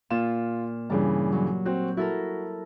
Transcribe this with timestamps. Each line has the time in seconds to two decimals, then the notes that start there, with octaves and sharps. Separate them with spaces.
0.11 A#2 F4 E7
0.90 G2 C#3 E3 G3
1.32 F#3
1.66 C4 F#4
1.97 E4 F#4 A4 A#4